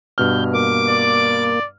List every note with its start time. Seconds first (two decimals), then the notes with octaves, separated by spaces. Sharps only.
0.18 G2 B2 F6 G6
0.54 A#3 D6
0.89 D5